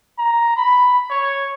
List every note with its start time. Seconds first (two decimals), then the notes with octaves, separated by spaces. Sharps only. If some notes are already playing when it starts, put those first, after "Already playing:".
0.18 A#5
0.56 B5
1.10 C#5